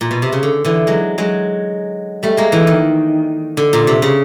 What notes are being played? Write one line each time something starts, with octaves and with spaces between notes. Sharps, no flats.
A#2
B2
C3
C#3
D3
D3 E3
F#3 G#3
F#3 G#3
G3 A3
G#3 A#3
D3 E3
D#3
D3
A#2
C3
C#3